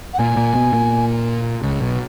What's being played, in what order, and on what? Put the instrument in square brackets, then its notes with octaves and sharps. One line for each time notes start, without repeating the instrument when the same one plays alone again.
[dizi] F#5
[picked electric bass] A#2 A#3 [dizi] G#5
[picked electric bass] A#2 A#3
B2 B3
A#2 A#3
C#2 C#3
B1 B2